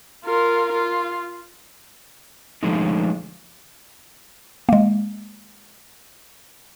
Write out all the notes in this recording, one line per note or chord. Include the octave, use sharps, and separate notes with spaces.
F4 A#4
F4
D3 F3 G#3 A3 B3 D#4
G#3 A#3